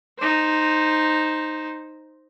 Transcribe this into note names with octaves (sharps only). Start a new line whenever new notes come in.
D#4 C5